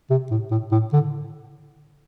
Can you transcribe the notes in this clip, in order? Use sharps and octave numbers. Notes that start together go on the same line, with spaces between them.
C3
A2
A2
A2
D3